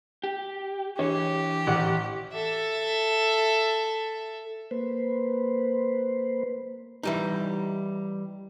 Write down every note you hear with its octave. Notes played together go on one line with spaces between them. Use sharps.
G4
E3 D4 G4 C#5
A1 F#5
A4 E5
A#3 B4 C5
E3 G3 D#4